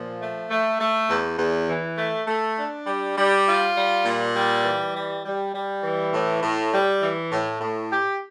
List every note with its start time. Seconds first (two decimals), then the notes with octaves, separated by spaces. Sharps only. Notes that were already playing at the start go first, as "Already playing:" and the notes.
Already playing: A#2 F3
0.20 A3
0.49 A3
0.79 A3
1.09 E2
1.38 E2
1.69 E3
1.97 A3
2.27 A3
2.57 D4
2.87 G3
3.17 G3
3.47 F4
3.76 G3
4.05 A#2
4.35 G3
4.64 E3
4.94 G3
5.23 G3
5.53 G3
5.83 E3
6.14 A2
6.42 A2
6.72 G3
7.02 E3
7.32 A2
7.61 A2
7.91 G4